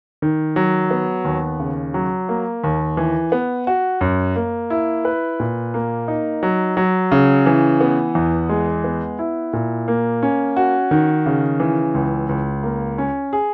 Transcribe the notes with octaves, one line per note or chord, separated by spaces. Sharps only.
D#3
F#3
B3
D#2
C#3
F#3
A#3
D#2
E3
B3
F#4
F#2
A#3
E4
B4
A#2
A#3
D#4
F#3
F#3
C#3
E3
B3
E2
G#3
B3
E4
A#2
A#3
C#4
F#4
D#3
C#3
E3
C#2
C#2
A#3
C#4
G#4